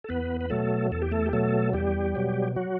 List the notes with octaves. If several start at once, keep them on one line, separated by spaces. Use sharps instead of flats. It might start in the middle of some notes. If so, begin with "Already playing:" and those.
A4
E2 B3 B4
B4
B2 F#3 A3 A4
E2 A4
G4
A3 A4
G4
B2 F#3 A3 A4
E2 G3 G4
B2 F#3
F#3 F#4